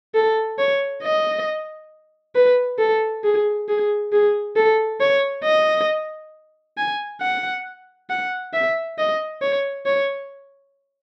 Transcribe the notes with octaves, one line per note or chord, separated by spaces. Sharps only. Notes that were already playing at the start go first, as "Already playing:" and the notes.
A4
C#5
D#5
B4
A4
G#4
G#4
G#4
A4
C#5
D#5
G#5
F#5
F#5
E5
D#5
C#5
C#5